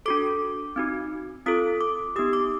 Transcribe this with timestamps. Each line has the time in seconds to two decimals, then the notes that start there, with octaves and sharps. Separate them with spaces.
0.06 D4 F#4 A4 D6
0.76 C4 D#4 F#4
1.46 C4 F4 A4 D#6
1.81 D6
2.16 B3 D#4 G4 D#6
2.33 D6